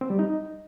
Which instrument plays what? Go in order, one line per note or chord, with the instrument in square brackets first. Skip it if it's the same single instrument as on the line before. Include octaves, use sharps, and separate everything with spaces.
[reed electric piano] C4
G3
D#4